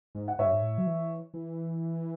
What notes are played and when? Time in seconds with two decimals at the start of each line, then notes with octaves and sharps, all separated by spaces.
0.15 G#2
0.28 F#5
0.39 G#2 C#5 E5
0.46 F#2
0.53 G#2
0.62 A2
0.78 F#3
0.87 E3
1.34 E3